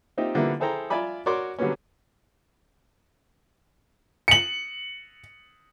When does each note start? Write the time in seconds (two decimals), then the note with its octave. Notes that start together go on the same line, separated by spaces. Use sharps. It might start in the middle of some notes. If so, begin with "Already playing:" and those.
0.17 A#3 C4 D#4 F4 G4 E5
0.35 D3 F3 G3 A#3 B3 E4
0.60 E4 G#4 A4 C5 G5 A#5
0.90 F4 D5 E5 G#5 B5 D6
1.26 F#4 A#4 C#5 D5 C6 D6
1.59 D3 F#3 G3 A#3 B3 C#4
4.28 C#7 F#7